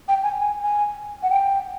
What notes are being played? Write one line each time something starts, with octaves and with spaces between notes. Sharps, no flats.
G5
G#5
G#5
G#5
F#5
G5